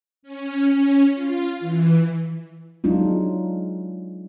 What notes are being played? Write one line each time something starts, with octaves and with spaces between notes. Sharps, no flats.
C#4
C#4
F4
E3
F#3 G#3 D4 D#4 F4